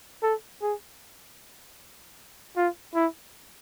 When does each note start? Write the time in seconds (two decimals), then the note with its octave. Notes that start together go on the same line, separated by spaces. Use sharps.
0.23 A4
0.62 G#4
2.56 F4
2.95 E4